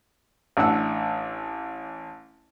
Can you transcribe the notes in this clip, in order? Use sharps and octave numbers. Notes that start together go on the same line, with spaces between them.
A1 D4 F#5 E6